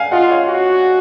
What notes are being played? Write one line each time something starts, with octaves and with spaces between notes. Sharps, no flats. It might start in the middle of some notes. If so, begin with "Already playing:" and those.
Already playing: F5 F#5 G#5
F4 D#5 F#5
C#5 F5
F#4